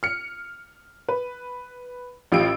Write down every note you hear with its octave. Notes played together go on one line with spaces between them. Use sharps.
F6 C#7
B4
A1 F4 G4 E6 D7